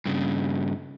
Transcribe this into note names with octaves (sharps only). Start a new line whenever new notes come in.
G2 C#3